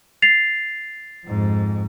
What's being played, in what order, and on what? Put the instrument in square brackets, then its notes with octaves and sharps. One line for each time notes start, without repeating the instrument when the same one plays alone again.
[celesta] A6 C7 F7
[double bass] F2 G#2